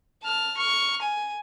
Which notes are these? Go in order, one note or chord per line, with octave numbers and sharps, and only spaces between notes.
A5 F6
C#6 F6
G#5